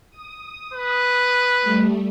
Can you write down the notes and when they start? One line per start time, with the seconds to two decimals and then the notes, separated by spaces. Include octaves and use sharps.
0.10 D#6
0.74 B4
1.62 G3 A3